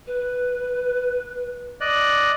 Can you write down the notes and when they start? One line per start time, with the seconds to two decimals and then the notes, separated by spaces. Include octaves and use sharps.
0.07 B4
1.81 D5 D#5 F#6